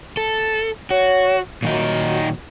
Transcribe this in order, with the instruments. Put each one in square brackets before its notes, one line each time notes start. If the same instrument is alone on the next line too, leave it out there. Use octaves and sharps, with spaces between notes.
[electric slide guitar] A4
[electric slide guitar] F#4 [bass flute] C#5
[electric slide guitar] A#2 D#3 D#4 [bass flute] F#3